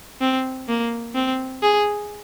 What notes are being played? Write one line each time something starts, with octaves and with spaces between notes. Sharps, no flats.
C4
A#3
C4
G#4